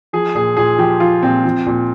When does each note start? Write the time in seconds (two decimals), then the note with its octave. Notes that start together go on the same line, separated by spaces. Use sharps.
0.13 F3 G#4
0.35 A#2 G#4
0.57 A#2 G#4
0.78 F3 G4
1.00 F3 F4
1.23 A#2 C4
1.45 F3
1.66 A#2